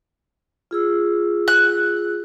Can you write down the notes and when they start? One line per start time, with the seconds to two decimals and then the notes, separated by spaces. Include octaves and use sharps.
0.71 F4 G#4 E6
1.48 F#6